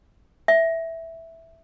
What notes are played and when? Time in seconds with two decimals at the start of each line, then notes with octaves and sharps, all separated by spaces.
0.48 E5